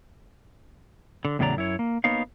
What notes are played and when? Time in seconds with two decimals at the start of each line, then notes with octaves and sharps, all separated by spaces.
1.25 D3
1.39 E2 A2 C#3 F#3 D5 A#5
1.56 F#2 E4 C#5
1.79 A#3
2.04 A#3 B3 D#4 C#5 F5